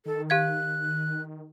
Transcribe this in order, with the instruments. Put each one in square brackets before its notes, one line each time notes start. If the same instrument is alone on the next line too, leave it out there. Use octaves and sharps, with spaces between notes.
[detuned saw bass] D#3 [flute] A4
[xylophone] G4 F5 G#6 [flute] F#6